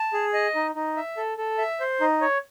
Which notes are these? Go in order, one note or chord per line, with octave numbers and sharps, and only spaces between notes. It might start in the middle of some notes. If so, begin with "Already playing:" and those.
Already playing: A5
G#4
D#5
D#4
D#4
E5
A4
A4
E5
C5
D#4
C#5